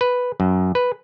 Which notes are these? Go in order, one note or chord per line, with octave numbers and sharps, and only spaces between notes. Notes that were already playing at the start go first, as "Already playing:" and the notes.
B4
F#2
B4